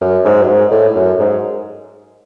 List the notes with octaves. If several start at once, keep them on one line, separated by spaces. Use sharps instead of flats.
F#2
G#2
F#2
G#2
A2
F#2
G#2